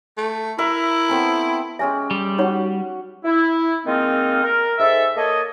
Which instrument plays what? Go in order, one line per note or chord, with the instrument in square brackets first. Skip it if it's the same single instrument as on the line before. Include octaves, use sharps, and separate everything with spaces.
[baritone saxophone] A3
[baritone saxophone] E4 [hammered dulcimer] A#4 E5
[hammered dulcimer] B3 C4 A4
[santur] G#3 C#4 G4 [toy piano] E5 G#5
[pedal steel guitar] G3
[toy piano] D#4 C#5 C#6 [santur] F#4 F#5
[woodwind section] E4
D#3 G#3 A#3 C4 D#4 F4
A#4
G#2 A4 E5
A#3 A4 C#5 D#5